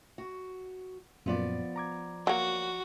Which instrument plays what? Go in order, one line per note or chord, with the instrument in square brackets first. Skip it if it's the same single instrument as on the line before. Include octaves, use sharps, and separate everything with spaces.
[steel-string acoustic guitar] F#4
[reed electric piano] F#2 A#2 [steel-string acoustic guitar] F3 B3 D5
[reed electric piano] A#5 D6 G#6
[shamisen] F#3 A#3 [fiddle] F#4